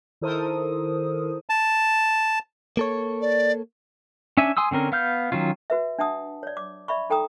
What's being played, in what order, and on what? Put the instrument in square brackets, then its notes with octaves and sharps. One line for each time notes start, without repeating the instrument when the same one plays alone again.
[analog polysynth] D#3 E4 A4 A#4 C5 D#6
[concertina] A5
[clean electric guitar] A#3 A4 C#5
[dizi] D5
[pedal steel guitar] C#4 D4 E5 G#5
G#5 C6 D#6 E6
D3 C4 C#4 A#4
B3 F5 F6 G6
D#3 F#3 C#4 F4
[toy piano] F#4 B4 E5
D4 E5 F#5 A5 D#6
C#5 D5
D6
D5 E5 B5 C#6
D#4 A4 G5 A#5 D#6